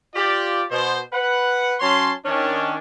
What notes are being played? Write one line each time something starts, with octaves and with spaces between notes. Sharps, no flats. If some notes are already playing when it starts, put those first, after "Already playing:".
F4 G4 D5
B2 C5
B4 F#5
F#3 C#4 C#5 A5 C6
D#3 C#4 D4